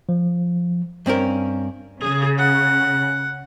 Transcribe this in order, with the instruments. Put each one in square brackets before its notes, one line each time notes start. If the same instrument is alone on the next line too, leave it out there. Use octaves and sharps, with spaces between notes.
[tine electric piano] F3
[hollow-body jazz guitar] G2 C4 C#4 A#4
[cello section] C#3 [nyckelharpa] G#4
[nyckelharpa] F#5